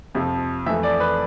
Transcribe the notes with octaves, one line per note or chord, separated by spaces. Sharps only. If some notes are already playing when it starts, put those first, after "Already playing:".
F2 C3 F3
F2 E3 A3 E5
D5
B4